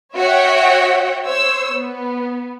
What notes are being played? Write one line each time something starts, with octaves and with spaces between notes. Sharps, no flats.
F#4 C#5 E5 F#5 G5
C5 C#5 E6
B3